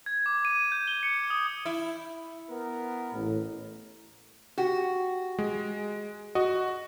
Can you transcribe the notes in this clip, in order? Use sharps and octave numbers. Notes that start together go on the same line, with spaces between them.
G#6
D6
D#7
G6
G7
C#7
D#6
E4
B3 A#4
A1
F#4 G4
G#3
F#4 D#5